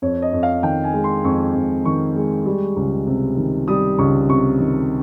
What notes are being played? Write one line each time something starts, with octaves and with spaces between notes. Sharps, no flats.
F2 C#5
D#5
F2
F5
D#3 G5
G#5
G#3
C6
F2 C#6
F2
D#3 C#6
G#3
G3
C#2
C3
D#3
G3 D#6
C#2 C#6
C3 C#6
D#3